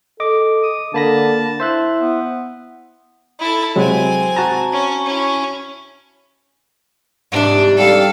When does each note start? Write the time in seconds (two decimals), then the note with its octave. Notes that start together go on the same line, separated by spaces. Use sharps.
0.20 A4 D#5 D6
0.63 D#6
0.94 D3 A#3 A5 B5 A#6
1.60 E4 C5 E5 F#6
2.00 B3
3.40 E4 A4
3.76 C3 F#3 G#3 C4 G#5
4.37 F#4 A5 A#5
4.72 C#4
5.06 C#4 E4
7.32 G#2 C3 E3 D4
7.77 G3 A4 F5